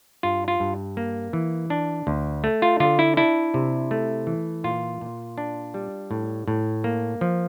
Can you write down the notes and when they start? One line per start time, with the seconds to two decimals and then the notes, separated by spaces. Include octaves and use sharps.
0.23 G2 F4
0.48 F4
0.60 G2
0.97 A#3
1.33 E3
1.70 D4
2.07 D2
2.44 A3
2.62 F4
2.80 D3 F4
2.99 E4
3.17 D4 E4
3.54 C3
3.91 A3
4.27 E3
4.64 A#2 F4
5.01 A#2
5.38 D4
5.74 G3
6.11 A2
6.48 A2
6.84 A#3
7.21 F3